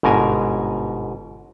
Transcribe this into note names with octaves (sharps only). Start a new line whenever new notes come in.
G1 G#2 B2 A#4 G#5